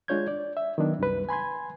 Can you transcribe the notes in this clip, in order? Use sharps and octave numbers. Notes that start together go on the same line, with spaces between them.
G#3 D4 F4 C#5 G6 G#6
D5
E5
D#3 F#3 B3 D4
C2 F#2 G3 B4
G#5 B5 C6 G#6